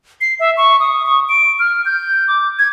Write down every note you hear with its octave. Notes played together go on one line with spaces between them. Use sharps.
C7
E5
C#6
D#6
C#6
D7
F6
G6
D6
G#6